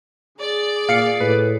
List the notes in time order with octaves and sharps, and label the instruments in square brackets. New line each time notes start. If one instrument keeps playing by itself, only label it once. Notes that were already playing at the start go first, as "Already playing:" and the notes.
[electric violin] G#4 [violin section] D5
[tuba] A#2 [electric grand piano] F5 C7 C#7
[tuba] A2 [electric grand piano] B4